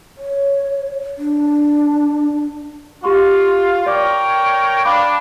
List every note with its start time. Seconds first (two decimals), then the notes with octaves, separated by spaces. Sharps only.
0.18 C#5
1.18 D4
3.04 F4 G4 C6 C#6
3.86 A#4 C#5 D5 G5 D6
4.85 D4 F5 B5 D6